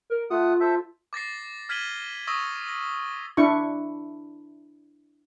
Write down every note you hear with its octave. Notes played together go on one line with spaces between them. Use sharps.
A#4
A3 F4 F#5 D#6
A4 C5 E5
D6 A6 A#6 C7
F6 G#6 B6 D#7 F#7 G7
C#6 D#6 E6 A#6
A#6
D4 E4 C#6